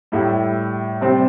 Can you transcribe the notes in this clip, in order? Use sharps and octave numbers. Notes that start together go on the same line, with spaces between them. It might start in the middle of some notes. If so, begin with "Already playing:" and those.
A2 G3 E4
C3 G3 C4